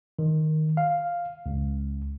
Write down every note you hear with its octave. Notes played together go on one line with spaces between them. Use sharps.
D#3
F5
C#2